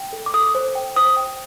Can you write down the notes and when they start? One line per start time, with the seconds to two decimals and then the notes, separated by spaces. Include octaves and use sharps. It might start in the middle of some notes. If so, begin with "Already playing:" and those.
Already playing: G5
0.13 A4
0.26 D6
0.34 A4 D#6
0.55 C5
0.75 G5
0.96 C5 D#6
1.17 G5